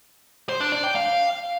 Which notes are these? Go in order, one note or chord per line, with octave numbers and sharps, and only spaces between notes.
C5
D4
D5
G5
F5